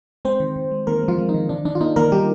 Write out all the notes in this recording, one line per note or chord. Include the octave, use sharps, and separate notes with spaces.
G#3 C4 C5
D#3
D#3
G#3
D#3 A#3 A#4
G#3
F3 F4
G#3
D#4
D#3
D#3 D4
D#3 D4
F4
A#3 D#4
D#3 A#3 A#4
G3 A#3 G4